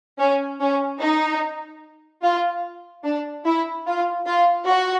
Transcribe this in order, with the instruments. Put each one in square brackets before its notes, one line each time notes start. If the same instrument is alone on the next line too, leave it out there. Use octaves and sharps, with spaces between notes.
[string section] C#4
C#4
D#4
F4
D4
E4
F4
F4
F#4